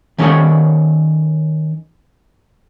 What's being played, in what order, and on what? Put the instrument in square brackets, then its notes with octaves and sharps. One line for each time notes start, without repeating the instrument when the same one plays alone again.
[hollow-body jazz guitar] D#3 C#4 G4 A4 C#5